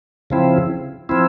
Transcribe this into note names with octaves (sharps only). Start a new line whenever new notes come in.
C#3 F3 C4 E4
F3 C4 E4